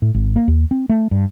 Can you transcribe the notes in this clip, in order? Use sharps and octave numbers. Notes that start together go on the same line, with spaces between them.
A2
G#1
A#3
D#2
C4
A3
G2